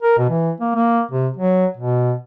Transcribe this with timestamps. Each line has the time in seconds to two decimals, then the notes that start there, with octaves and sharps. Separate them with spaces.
0.02 A#4
0.18 B2
0.30 E3
0.60 A#3
0.75 A#3
1.11 C3
1.37 F#3
1.77 B2